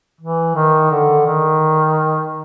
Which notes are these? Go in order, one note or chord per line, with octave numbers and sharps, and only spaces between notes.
E3
D#3
D3
D#3